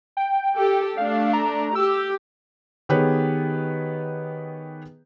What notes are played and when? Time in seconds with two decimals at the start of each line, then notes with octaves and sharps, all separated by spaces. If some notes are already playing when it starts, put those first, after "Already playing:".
0.17 G5
0.56 G4 A4
0.97 A3 D4 F5
1.33 A#5
1.75 G4 E6
2.89 D#3 B3 G4 G#4 B4 C#5